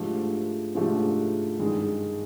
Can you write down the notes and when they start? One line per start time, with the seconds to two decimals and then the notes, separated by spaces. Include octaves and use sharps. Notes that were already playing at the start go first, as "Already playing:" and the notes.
Already playing: G#2 F3 A3 D4 G4
0.74 G#2 F3 A3 D4 G4
1.59 G2 D#3 G#3